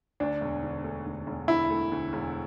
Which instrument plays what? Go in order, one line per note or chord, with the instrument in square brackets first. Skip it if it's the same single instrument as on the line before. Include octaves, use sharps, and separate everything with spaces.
[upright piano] D2 [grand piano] D4
[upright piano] E1
D3
A3
D2
E1
[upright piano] D3 [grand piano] E4
[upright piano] A3
D2
E1